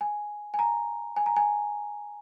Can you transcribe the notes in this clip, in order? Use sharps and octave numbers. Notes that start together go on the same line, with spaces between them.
G#5
G#5
A#5
G#5
A#5
G#5